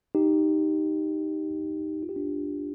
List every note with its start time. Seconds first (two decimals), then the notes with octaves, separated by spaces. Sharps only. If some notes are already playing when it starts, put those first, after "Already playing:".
0.15 D#4 G4
2.03 F4
2.09 G4
2.16 D4 F4